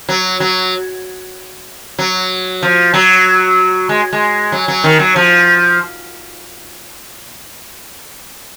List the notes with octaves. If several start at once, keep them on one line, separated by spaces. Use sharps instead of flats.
F#3
F#3
F#3
F3
F#3
G#3
G#3
F#3
F#3
D#3
F#3
F3